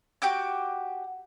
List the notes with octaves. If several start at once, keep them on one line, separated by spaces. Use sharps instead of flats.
F#4 G4 D6 G6